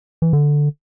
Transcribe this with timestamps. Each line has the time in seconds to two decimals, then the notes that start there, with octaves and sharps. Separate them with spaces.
0.22 E3
0.33 D3